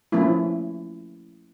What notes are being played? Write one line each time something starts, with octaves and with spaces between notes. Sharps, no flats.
F3 A3 A#3 C#4 E4